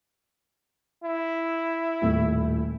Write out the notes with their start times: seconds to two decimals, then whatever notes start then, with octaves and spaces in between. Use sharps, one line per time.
1.04 E4
2.02 D#1 A2